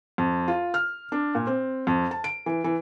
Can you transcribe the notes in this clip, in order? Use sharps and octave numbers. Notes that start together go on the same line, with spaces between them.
F2
F4
F6
D4
A#2
C4
F2
A5
D7
E3
E3